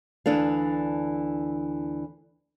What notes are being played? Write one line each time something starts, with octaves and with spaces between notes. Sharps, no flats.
D2 E3 D4 A4 F5